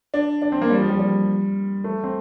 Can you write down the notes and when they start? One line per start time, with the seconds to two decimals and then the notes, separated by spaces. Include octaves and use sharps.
0.14 D4
0.42 D4
0.52 C4
0.62 A#3
0.70 G3
0.80 F3
0.89 G3
1.00 G3
1.84 A3
2.04 C4